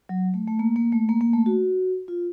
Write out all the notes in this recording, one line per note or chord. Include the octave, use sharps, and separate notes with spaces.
F#3
A3
A3
A#3
A#3
A3
A#3
A#3
A3
F#4
F4